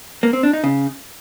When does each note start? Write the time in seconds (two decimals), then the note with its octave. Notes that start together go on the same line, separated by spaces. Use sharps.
0.23 A#3
0.33 C4
0.43 D4
0.53 D#4
0.64 C#3